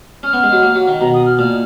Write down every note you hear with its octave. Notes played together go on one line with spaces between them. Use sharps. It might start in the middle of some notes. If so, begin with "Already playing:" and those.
C#4 F6
B3
G#3
F#3
A#3
F#3
D#3
B2 A#5
D#6
F6
A#2 F6